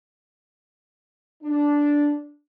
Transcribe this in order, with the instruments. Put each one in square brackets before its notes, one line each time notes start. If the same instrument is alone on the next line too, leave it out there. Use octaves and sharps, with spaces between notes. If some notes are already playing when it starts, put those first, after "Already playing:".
[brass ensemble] D4